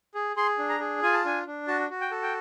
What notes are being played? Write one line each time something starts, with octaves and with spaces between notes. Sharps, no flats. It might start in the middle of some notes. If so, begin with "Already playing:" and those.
G#4
G#4 C6
D4
A#5
G#4
F4 G#5
A5
D4 G#5
D4
F#4 A5
F#4
G5
A4
G5